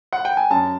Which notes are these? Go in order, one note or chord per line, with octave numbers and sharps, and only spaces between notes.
F#5
G5
G#5
F#2 A5